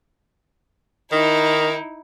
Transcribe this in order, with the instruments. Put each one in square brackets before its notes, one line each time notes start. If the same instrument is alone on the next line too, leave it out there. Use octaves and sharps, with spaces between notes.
[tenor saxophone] D#3 [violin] D#4 E4